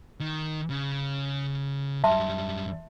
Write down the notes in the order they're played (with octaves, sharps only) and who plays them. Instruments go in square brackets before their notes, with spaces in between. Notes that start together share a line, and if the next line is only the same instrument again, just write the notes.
[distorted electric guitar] D#3
C#3
[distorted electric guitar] F#2 G3 [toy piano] E5 A5 C6